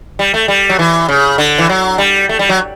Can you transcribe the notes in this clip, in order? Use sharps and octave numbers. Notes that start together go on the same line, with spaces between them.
G3
A3
G3
F#3
E3
C#3
D3
E3
F#3
G3
A3
G3
F#3